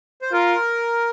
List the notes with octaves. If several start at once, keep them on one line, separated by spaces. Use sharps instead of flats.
C5
F4 A#4